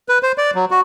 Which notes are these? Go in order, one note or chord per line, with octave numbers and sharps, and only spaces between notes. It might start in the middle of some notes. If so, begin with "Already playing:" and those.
B4
C5
D5
F#3
F#4